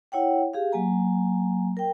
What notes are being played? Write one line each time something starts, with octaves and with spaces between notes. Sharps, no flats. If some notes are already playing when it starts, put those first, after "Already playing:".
E4 C#5 F#5 G5
G4 G#4 F5
F#3 A#3 G#5 A#5
A#4 G5